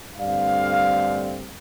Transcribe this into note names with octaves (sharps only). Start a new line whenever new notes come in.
G2 D3 A3 C4 D5 F5